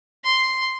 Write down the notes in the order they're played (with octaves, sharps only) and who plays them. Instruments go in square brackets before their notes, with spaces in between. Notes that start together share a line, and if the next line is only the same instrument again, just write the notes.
[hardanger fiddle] C6